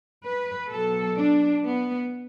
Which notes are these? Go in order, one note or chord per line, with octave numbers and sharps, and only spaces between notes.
B4
B2 F#3 A4
D4
B3